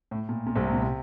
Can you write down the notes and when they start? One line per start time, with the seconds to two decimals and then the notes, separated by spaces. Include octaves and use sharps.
0.11 A2
0.29 A#2
0.47 A#2
0.56 C2 C3
0.64 A2
0.73 A#2
0.82 C3